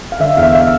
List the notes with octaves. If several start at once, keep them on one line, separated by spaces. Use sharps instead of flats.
F5
D3 E5
E2 F5
E5
E5